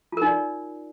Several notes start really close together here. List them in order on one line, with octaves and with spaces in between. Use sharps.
F4 A#4 D#4 D5